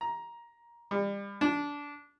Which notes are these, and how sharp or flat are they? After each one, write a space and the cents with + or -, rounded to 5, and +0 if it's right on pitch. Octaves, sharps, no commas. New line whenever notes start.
A#5 +15
G3 +35
D4 -20